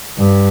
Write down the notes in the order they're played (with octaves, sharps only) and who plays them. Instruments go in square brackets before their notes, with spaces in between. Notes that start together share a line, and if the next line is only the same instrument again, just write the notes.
[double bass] G2